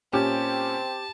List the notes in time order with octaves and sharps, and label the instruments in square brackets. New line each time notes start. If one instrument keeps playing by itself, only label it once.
[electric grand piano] A#2 C#4 [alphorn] C4 [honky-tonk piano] G4 [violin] A5